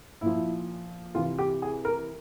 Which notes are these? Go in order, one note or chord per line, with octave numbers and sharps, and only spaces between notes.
A#2 F3 E4
C3 E3 F4
G4
G#4
A#4